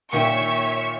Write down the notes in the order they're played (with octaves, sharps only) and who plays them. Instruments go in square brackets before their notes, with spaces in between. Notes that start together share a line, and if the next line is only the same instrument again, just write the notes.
[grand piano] A#2 D#3 G5 [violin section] C#5 E5 C#6